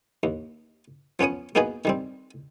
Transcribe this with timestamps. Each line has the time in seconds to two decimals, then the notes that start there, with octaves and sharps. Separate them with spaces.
0.23 D#2
1.19 F3 B3 C#4 C#5 D#6
1.55 A#3 B3 D#4 F#4 G#4 B4
1.85 D#3 G3 C4